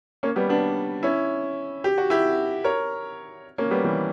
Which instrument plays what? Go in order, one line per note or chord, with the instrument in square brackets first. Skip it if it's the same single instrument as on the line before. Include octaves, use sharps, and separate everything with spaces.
[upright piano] A#3 C#4
G3 B3
B3 D4
C#4 E4
G4
F#4
E4 G4
A#4 C#5
A#3 C#4
G3 B3
E3 G3